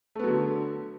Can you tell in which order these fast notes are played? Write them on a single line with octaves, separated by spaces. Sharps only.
A3 B3 F#3 D3